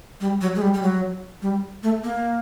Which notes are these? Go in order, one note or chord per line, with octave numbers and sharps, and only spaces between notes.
G3
F#3
G#3
G3
G3
F#3
G3
A3
A#3